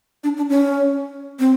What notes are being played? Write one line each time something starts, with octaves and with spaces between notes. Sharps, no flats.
D4
D4
C#4
C4